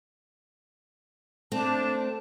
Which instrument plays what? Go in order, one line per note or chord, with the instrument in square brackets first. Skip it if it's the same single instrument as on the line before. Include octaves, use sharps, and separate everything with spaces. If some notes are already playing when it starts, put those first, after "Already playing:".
[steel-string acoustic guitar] A3 C4 [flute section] D4 A5